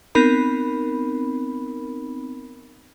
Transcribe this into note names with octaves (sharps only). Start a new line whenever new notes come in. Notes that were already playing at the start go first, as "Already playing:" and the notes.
B3 C4 D#4 A#4 B5